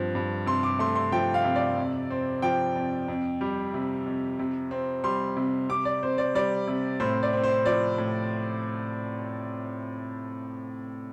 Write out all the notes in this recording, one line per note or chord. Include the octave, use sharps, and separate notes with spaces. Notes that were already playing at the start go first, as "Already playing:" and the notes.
Already playing: G2 F3 C4
G2
C3 C6
D6
A3 C6
C6
F3 G5
F5
C3
D5
F2
C4
F3 G5
F2
F2
G3
C3
F2
C3
C4
G3 C6
C3
C3 D6
D5
C4 C5
D5
G3 D5
C3
A2 C5
D5
C4
C5
F3 D5
A2